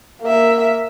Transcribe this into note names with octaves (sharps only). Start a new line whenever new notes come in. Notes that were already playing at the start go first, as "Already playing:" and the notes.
A#3 E5